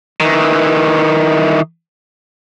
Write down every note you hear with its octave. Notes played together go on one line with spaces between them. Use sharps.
D#3 E3